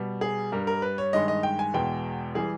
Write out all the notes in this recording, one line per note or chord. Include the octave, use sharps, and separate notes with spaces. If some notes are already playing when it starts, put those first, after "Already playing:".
Already playing: B2 G3
G#4
G2 G3 A#4
A#4
B4
C#5
G2 D#3 G#3 D#5
D#5
G5
G#5
E2 B2 G#3 G5
E3 G3 G#4